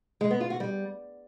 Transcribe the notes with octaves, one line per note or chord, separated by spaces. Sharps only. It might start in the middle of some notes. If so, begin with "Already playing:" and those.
G#3
B3
F4
F#4
G3